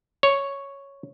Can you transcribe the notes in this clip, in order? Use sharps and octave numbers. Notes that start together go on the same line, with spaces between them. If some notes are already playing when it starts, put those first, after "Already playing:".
C#5